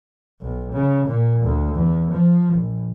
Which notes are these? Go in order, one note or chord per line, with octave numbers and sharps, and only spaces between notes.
B1
C#3
A#2
D2
E2
F3
A#1